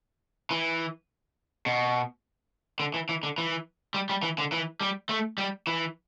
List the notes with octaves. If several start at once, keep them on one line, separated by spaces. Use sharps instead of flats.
E3
B2
D3
E3
E3
D3
E3
G3
G3
E3
D3
E3
G3
A3
G3
E3